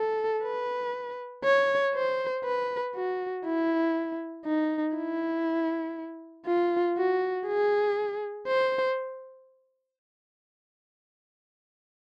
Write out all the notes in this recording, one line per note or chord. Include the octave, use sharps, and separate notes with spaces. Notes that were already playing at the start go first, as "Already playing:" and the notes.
Already playing: A4
B4
C#5
C5
B4
F#4
E4
D#4
E4
F4
F#4
G#4
C5